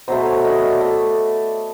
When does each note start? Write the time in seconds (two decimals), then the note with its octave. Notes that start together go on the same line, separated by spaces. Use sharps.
0.08 B2 F#3 A3 C5
0.26 C#5
0.45 D#5
0.63 D5
0.81 A3